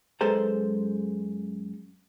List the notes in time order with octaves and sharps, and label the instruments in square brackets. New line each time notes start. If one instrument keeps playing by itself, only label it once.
[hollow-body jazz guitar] F#2 G#3 A4 B4 C5 A#5